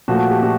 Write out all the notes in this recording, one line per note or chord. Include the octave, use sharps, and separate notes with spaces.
A#2 F3 A3 F#4
F#4
G4
A#2 F#4